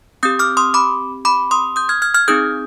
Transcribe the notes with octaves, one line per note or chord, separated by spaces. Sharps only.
C4 G4 D#6 G6
D6 F6
C6 D#6
B5 D6
B5 D6
C6 D#6
D#6 G6
F6 G#6
F6 G#6
F6 G#6
C4 D#4 G#4 D#6 G6